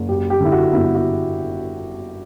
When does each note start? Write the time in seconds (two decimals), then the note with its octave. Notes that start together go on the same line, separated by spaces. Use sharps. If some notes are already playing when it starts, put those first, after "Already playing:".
Already playing: F#1
0.09 F#2 G4
0.30 G4
0.41 D3 E4
0.52 F#4
0.73 G1 E4
0.95 F#4